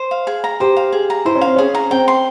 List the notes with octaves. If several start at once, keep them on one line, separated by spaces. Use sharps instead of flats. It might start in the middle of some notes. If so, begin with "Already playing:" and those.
Already playing: C5
F5
G#4
A#5
G4 C5
F5
G#4
A#5
E4 C5
C#4
C4 F5
C#4 G#4
A#5
C4 G5
C6